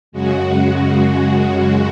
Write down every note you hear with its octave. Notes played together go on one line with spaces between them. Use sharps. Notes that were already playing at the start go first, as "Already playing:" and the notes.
F#2 C#3 G#3 F#4
F#2 C#3 G#3